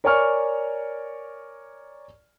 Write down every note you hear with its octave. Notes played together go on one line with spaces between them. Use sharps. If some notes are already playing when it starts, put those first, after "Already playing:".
A#4 C#5 D5 G#5 C#6 F6